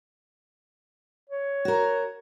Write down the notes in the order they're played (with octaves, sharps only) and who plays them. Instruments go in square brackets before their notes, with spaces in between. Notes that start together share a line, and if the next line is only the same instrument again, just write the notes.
[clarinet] C#5
[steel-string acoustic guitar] F#4 A#4